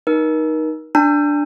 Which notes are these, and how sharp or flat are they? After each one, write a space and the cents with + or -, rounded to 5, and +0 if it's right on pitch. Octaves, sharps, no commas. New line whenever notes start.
D#4 +0 A#4 +35
D4 +0 A5 +45